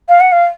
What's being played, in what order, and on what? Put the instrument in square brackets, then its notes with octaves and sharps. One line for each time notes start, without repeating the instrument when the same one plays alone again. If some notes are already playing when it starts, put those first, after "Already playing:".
[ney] F5
F#5
F5